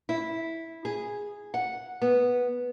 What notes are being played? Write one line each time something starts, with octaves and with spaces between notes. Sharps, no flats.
E4
G#4
F#5
B3